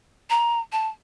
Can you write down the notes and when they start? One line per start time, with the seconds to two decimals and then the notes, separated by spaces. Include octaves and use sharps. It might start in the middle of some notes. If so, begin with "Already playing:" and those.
0.30 A#5
0.73 A5